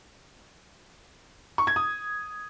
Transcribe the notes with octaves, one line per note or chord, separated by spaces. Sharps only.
C#6
G#6
D#6